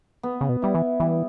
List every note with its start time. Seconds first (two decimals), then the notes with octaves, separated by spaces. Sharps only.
0.23 B3
0.41 C#3
0.49 B2
0.62 G3 E4
0.75 E3
1.00 E3 G3